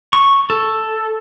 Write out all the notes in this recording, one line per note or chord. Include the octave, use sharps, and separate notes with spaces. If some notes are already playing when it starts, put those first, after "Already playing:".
C#6
A4